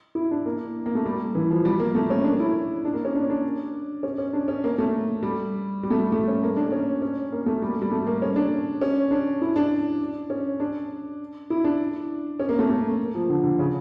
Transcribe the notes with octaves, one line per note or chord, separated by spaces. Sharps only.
E4
D4
A#3
A#3
A3
G3
E3
F3
G3
A#3
A3
C#4
D4
E4
D4
A#3
C#4
D4
D4
C#4
C#4
D4
C#4
A#3
A3
G3
G3
A3
G3
A3
C#4
A#3
D4
C#4
C#4
A#3
A3
G3
G3
A3
A#3
C#4
D4
C#4
D4
E4
D4
C#4
D4
E4
D4
C#4
A#3
A3
A3
F3
D3
D3
C#3